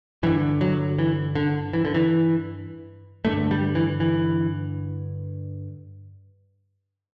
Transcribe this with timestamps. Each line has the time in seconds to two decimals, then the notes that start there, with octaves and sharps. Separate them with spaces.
0.23 G2 D3 E3
0.61 F#3
0.99 E3
1.35 D3
1.73 E3
1.85 D3
1.94 E3
3.25 G2 D3 A3
3.51 G3
3.75 E3
4.00 E3